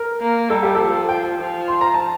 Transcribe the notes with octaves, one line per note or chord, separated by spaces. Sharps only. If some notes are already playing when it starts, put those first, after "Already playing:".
Already playing: A#4
A#3
G3 A4
G4
F3 A4
G5
F3
C6
A#5
A5